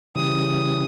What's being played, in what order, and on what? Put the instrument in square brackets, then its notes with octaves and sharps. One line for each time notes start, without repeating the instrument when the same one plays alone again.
[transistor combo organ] C#3 E3 G3 [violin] D#6